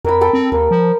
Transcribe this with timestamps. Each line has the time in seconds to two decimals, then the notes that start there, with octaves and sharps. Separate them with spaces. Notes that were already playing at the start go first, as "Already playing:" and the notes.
0.05 F2 A#4 B5
0.21 A4 G5 B5
0.33 C4
0.52 D#2 A#4
0.71 F3